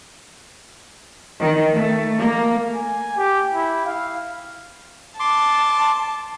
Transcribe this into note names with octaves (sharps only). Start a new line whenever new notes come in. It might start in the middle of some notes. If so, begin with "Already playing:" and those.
D#3
A3
A#3
G#5
G4
E4
F5
A5 C6 D6